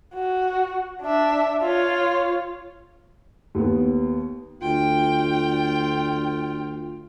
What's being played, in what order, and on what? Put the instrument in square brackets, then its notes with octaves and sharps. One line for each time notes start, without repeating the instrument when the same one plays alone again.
[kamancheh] F#4
D4 E5
F4 C#5
[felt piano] D#2 B3
[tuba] D2 [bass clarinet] F4 [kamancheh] G5